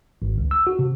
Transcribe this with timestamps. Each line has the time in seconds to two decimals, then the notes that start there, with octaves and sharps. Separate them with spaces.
0.22 G#1
0.38 C#2
0.51 E6
0.67 F#4
0.79 C3